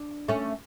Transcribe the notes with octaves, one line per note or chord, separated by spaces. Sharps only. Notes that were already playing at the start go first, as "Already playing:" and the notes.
Already playing: D4
A3 C#4